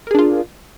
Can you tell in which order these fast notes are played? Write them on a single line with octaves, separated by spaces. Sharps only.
A#4 G#4 D4 F4